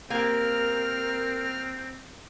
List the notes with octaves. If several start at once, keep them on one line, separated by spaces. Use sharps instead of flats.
A#3 C4 G4 A#4 F6